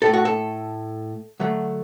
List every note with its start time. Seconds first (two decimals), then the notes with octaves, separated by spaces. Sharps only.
0.02 A2 A3 A4
0.13 F#4
0.25 A4
1.40 D3 F#3 A3